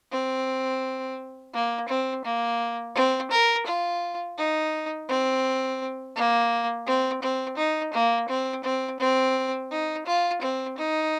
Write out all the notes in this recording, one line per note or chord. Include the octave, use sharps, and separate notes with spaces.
C4
A#3
C4
A#3
C4
A#4
F4
D#4
C4
A#3
C4
C4
D#4
A#3
C4
C4
C4
D#4
F4
C4
D#4